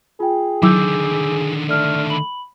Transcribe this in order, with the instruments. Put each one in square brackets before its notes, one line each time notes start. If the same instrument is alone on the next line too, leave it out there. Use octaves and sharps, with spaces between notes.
[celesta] F4 G5 [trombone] G#4
[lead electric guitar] D3 D#3 [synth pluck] F#3 E4 [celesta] D6 E6 G6
[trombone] A3 [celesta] D5 F6
[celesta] B5 F#7